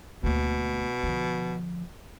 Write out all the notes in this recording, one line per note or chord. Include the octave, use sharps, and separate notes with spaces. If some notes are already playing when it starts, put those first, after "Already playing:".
D2 B2 A#3
D3 F3